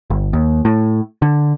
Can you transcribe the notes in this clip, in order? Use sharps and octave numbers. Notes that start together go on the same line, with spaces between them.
G1
D#2
A2
D3